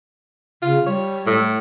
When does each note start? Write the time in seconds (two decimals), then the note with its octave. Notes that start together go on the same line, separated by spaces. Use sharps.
0.62 C#3 F4
0.86 G3 C#5
1.26 A2